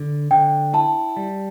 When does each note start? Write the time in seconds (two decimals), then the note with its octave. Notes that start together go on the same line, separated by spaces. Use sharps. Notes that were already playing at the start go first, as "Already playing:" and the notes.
Already playing: D3
0.31 D3 G5
0.74 E4 A5
1.17 G3